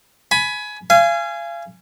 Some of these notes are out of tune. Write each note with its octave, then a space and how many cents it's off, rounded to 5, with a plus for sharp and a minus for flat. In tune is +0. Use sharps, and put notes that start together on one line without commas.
G#5 +25 B5 +0
F5 -35 G#5 +0